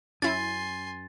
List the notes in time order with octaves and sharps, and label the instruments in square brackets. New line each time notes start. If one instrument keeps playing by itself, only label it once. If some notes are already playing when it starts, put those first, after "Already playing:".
[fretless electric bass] F#2 [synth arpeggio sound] C#4 E4 [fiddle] G#5 C6 [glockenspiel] A6